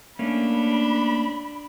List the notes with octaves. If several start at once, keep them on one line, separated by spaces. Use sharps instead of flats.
A3 A#3 C#4 D4 B5